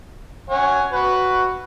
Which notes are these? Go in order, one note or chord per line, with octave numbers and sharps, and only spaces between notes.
C#5 F#5 G#5
F#4 B4 B5